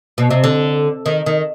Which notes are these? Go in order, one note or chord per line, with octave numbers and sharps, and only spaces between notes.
B2
C3
D3
D#3
D#3